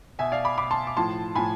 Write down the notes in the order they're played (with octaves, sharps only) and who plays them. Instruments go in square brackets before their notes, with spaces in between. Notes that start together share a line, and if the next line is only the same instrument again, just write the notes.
[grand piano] B2 E5 G#5
D5 F5
B5 D6
B2 B5 D6
A5 C6
D6
A2 F3 A5 C6
A2 F3 G#5 B5